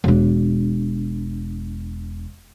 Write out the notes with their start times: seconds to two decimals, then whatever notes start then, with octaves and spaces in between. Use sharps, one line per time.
0.04 E1 D4